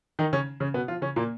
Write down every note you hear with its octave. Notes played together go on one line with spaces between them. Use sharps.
D#3 D#4
C#3 C#4
C#3 C#4
B2 B3
F3 F4
C#3 C#4
A#2 A#3